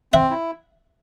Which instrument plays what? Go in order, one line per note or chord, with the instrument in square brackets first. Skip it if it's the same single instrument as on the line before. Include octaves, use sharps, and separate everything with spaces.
[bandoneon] C4 [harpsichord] E5 F#5
[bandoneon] E4